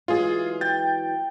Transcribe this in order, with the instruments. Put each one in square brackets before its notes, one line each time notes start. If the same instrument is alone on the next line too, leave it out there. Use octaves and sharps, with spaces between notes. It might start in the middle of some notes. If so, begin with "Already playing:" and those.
[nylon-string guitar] E3 F#3 G#3 [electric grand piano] F4 G#4
[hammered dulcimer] G5 [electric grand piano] A6